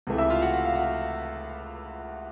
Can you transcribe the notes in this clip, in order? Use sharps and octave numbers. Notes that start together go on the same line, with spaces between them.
C#2 C3 E3 A3
E4 E5
F4 F5
F#4 F#5
F#5
F5
F#4 F#5